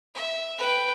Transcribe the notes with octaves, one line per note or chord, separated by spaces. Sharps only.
E5
B4 G5